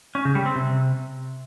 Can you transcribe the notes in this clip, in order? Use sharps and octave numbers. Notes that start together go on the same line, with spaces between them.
C#4
C#3
G3
C4
C3